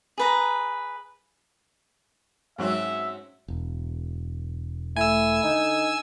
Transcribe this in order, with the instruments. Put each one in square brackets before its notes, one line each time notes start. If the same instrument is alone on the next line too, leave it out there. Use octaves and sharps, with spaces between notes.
[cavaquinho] G#4 B4 A#5
[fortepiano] G#2 F#3 [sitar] C4 C#4 F#4 [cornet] E5
[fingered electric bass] E1
[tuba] A3 [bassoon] E4 [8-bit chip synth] G#5 E6
[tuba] D3 [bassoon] D#4